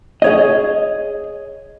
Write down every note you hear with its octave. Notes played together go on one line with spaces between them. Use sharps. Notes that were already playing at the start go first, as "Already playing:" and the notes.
G#4 C#5 D#5